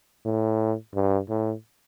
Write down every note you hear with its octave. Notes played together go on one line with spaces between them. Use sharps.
A2
G2
A2